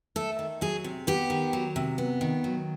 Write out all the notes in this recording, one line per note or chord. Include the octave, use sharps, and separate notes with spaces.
A3 A4
D#3
F#3 G#4
C3
B3 G4
D#3
F#3
C3
B3
D#3
F#3